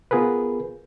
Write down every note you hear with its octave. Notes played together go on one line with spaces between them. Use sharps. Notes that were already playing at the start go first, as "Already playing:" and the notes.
B3 F4 G#4 A#4 B4